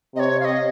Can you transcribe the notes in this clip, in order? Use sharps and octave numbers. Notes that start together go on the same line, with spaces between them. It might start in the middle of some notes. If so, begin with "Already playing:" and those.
C3 C#5 D#5
F5
D#5